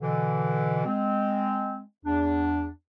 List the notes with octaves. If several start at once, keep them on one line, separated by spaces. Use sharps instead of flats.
B2 D3 E3
G#3 C4
E2 D4